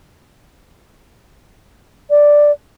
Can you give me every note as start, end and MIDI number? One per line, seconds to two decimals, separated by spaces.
2.10 2.52 74